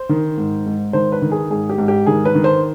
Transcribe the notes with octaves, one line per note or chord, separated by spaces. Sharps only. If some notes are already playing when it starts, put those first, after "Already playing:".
Already playing: C5
D#3
G#2
G#2
D#3 C5
B4
D#3
G#4
G#2 G#4
G4
G#2
G4
D#3 G#4
B4
D#3
C5